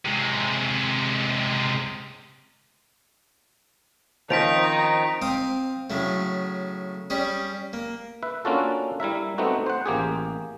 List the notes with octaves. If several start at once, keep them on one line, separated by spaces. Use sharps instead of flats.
C3 G#3
D#3 F3 C4 C#4 D#4 B6 D7 F7
C4 F5 D#6
A2 C#3 F#3 A3
G3 C#4 G#4
A#3
B4 E5
A#3 C#4 D4 F4 F#4 A4
G3 E4 A#4 E5
A3 B3 C4 D#4 F#4
C5 F#5
A1 A#3 G4 G#4